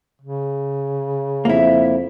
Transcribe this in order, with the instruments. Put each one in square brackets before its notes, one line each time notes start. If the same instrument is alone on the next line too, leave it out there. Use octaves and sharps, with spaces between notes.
[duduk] C#3
[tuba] F2 [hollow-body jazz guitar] A#3 E4 [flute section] E5